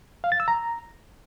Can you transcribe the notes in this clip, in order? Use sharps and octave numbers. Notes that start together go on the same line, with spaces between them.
F5
A6
E6
A#5